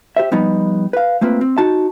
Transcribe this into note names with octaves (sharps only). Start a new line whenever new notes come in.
G4 C5 E5
F3 G3 B3 D#4
B4 F5
A3 A#3 C4 F4 B4
C4
D#4 F#4 A5